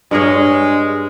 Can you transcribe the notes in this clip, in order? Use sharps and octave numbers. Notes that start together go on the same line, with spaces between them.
G2 G#3 A#4 C#5